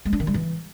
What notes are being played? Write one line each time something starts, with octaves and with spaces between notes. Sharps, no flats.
G#3
D4
D#3
G3
E3